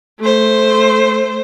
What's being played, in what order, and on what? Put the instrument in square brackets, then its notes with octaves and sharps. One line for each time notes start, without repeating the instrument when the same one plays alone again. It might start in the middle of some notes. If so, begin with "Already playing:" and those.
[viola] A3 C5